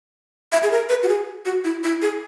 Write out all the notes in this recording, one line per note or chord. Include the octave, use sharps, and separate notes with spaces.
E5
G#4
A#4
B4
F#4
G#4
F#4
E4
E4
G#4